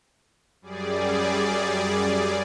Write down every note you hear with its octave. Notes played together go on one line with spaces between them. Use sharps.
F#2 G3 G#4 D5